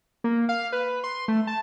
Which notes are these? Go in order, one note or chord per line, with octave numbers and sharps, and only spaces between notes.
A#3
F5
B4
C6
A3
A5